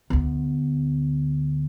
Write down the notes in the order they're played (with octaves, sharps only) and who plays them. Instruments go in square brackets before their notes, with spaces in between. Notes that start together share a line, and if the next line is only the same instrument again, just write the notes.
[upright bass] D2 B3